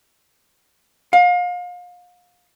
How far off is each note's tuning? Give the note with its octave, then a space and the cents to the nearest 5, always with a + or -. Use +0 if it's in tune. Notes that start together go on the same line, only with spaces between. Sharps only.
F5 +35